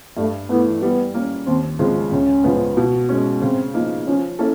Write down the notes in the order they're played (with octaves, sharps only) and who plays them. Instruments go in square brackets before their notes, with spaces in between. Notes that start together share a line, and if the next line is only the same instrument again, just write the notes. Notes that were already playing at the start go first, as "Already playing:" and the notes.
[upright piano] G2 [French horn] A3
[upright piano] E3 A3 [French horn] B3
[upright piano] G3 [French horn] B3
[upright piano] A#3 C#4
[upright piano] D#2 [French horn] C4
[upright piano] C#3 F3 G#3 [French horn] C4
[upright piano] C#2 [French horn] C#4
[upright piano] C#3 F3 G#3 B3
B2
G#3 C#4
[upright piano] C#3 [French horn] C4
[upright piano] F3 A#3 D#4
[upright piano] F3 [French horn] C#4
[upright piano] A#3 C#4 E4 A4